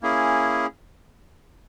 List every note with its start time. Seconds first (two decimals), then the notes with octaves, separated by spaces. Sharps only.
0.02 A#3 C#4 E4 G#4